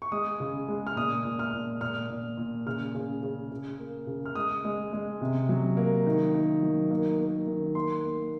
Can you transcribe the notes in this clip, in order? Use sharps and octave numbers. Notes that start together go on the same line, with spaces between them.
C#6
G#3 D#6
C#3
G#3
F6
A#2 D#6
A#2
F6
A#2
A#2 F6
A#2
A#2
C#3 F6
C#3
C#3
C#3
A#3
C#3
F6
G#3 D#6
G#3
G#3
C3
F#3
A#3
D#3
D#3
F#3
A#3
A#3
D#3
A#3 C6
A#3